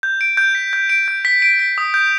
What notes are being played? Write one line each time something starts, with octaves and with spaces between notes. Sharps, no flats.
G6
D7
G6
B6
G6
D7
G6
B6
D7
B6
D#6
G6